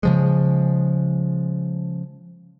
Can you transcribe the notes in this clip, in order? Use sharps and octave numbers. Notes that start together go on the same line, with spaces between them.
C#3 F3 G#3